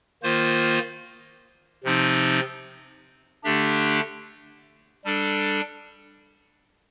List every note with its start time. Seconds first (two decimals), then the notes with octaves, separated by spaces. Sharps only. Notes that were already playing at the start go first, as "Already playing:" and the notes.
0.23 D#3 A#3 F4 C5
1.84 C3 F3 C4 D#4
3.44 D3 A3 D4 G4
5.05 G3 D4 A4